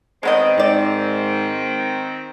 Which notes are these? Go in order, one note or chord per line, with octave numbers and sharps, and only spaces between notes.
D#3 G#3 B3 C4 D#5
G#2 D#4 D5